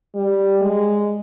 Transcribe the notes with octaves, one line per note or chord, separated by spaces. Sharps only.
G3
G#3